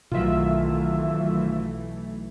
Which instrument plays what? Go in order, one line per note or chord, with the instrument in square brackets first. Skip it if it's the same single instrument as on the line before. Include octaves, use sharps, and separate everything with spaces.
[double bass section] B1 E3 A3 [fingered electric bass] B2 D#3 F#3 [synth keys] F4 E5